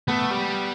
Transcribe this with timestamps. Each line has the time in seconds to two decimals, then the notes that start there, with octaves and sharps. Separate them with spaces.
0.08 A3 B3
0.30 G3